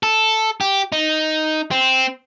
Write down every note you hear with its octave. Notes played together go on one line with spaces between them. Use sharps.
A4
G4
D#4
C4